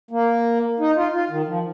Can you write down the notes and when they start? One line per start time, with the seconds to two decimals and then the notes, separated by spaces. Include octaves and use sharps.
0.11 A#3
0.79 D#4
0.96 F4
1.12 F4
1.30 D#3
1.47 F3